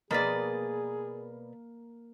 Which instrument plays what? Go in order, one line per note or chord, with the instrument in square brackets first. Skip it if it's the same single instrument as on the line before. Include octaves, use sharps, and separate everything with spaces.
[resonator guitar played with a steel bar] B2 B4 D5 [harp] A#3 [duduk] G#4